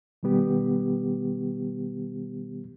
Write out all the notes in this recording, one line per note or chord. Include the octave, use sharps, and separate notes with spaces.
B2 D#3 G3 B3 G4